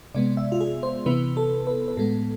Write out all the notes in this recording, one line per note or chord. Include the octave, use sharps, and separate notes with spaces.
C3 G#3 B3 D5
E5
F4
G#4
C5
C3 E3 B3 B4
A4
B4
B4
A2 G#3 B3 A4